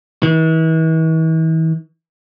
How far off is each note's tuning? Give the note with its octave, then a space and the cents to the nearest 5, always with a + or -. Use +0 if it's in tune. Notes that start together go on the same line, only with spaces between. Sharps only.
E3 -40